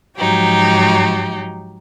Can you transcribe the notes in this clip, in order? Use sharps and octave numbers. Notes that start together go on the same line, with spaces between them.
G#2 F3 F#3 D#4 G4